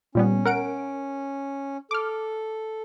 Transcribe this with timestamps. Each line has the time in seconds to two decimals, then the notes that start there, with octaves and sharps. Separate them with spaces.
0.15 A#2 G3 B3 C#4
0.45 A#4 F#5 D7
1.91 A4 D6 F6